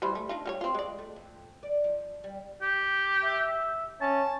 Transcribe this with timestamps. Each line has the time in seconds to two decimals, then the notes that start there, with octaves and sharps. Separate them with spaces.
0.02 E3 G3 C5
0.15 A3
0.29 D4 D#4 F4
0.46 G3 G4 C#5
0.61 C4 F4
0.75 G#3 D5
0.99 A3
1.16 F2
1.63 D5
1.84 F3
2.24 G3
2.62 G4
3.24 E5
4.01 C#4 A5